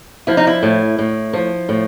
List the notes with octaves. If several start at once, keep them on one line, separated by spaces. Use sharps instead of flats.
F3 E4
D#4
E4
A2
A2
F3
A2